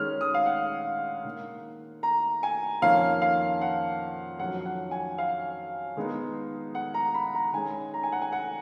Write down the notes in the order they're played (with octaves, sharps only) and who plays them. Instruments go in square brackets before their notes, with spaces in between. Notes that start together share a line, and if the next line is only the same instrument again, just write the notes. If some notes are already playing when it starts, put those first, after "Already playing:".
Already playing: [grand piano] D#3 G#3 C#4 F6
D#6
F5
F#5
D#3 A#3 D#4
A#5
G#5
F2 D#3 A#3 C#4 F5
F5
F#5
F2 D#3 F#3 C#4 F#5
F#5
G#5
F5
D#3 G#3 B3 D#4
F#5
A#5
B5
A#5
D#3 G#3 C#4 G#5
A#5
G#5
F#5
G#5
F#5